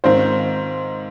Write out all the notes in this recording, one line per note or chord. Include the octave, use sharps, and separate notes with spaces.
G#2 D#3 C4 F4 C5